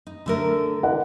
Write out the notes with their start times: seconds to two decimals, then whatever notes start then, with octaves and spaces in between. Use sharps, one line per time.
0.07 D#4
0.26 D3 A3 A#4
0.83 F#5